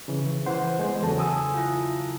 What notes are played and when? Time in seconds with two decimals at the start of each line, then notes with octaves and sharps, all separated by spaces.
0.08 C#3 E3
0.46 E3 C5 F#5
0.79 G#3 B3 C5
1.03 E2 C#3 F#3 A4 A5
1.18 G#5 D#6 E6
1.54 E4 F4